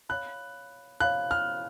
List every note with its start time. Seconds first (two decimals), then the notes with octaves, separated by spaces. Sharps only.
0.09 C#5 F5 B5 F#6
1.00 C#5 F5 B5 F#6
1.31 F6